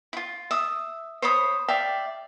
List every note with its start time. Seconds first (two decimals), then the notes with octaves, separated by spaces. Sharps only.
0.13 E4 F4
0.51 E5 D#6
1.22 C5 C#5 B5 D#6
1.68 D5 E5 F5 G5